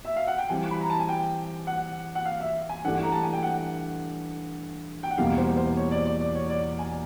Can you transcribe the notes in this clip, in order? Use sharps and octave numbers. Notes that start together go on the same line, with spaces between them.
E5
F5
F#5
G5
E3 G3 C4 G#5
B5
A#5
A5
G#5
G5
F#5
F#5
F5
E5
G#5
G2 E3 A3 D4 G4 F#5
A#5
A5
G#5
G5
F#5
G5
F#5
E2 B2 G3 A#3 F5
C5
C5
C#5
D5
D5
D5
C#5
D5
G#5